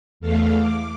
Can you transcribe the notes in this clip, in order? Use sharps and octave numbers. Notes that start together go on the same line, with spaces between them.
E2 A3 F5
D6